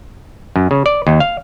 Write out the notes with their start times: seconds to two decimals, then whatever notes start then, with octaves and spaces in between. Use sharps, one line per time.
0.56 F#2
0.71 C#3
0.86 D5
1.07 D#2
1.20 F5